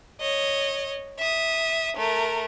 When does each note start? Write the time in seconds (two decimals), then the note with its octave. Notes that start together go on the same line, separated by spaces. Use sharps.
0.21 C#5 D#5
1.19 E5 D#6
1.97 A3 A#4